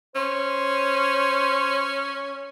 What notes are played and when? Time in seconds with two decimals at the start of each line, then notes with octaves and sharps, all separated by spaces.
0.15 C#4 C5